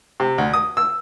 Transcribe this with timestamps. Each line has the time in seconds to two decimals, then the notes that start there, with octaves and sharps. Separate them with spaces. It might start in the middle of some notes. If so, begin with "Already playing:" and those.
0.20 C3
0.38 D2
0.54 D#6
0.77 E6